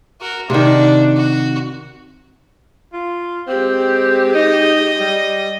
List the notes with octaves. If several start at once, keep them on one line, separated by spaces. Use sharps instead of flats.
F#4 A#4
C3 D#3 D4 F#4
F#4
F4
G#3 C4 G4
D#4 D#5
G3